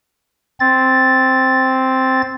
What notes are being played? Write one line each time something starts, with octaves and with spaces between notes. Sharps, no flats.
C4 A6